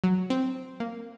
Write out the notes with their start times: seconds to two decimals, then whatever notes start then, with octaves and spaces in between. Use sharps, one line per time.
0.04 F#3
0.30 C4
0.80 A#3